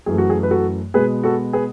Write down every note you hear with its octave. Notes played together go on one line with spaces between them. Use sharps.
F#2 E3 A3 G#4
F#4
G#4
B4
F#4 A4
B2 G#3 B3 G#4 B4
F#4 A4
G#4 B4